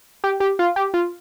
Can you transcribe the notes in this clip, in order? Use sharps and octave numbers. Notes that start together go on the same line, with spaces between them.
G4
G4
F4
G4
F4